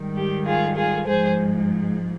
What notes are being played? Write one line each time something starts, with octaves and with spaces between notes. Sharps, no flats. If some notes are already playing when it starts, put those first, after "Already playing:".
Already playing: G#2 D#3 G3
G4
F4 G#4
F4 G#4
G#2 F3 G#3 G#4 C5